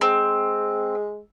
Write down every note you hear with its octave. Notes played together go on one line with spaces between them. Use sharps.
G#3 C4